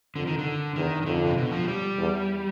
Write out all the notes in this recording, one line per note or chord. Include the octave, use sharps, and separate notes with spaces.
F2 D3
D#3
D3
E2 D#3
D#3
F2 D3
C3
B2
F3
G#3
G3
E2